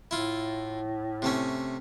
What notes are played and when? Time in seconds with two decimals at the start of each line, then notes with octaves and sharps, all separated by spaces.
0.11 A2 E4 F4
1.22 C3 A3 C#4